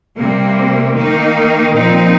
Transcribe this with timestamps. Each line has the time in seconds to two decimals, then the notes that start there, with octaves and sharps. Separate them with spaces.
0.16 C3 G3 A#3
0.95 D#3 A#3 D#4
1.75 A#2 F3 C4 D#4